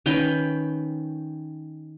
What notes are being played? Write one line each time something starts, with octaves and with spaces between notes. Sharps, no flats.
D#3 C#4 B4 G5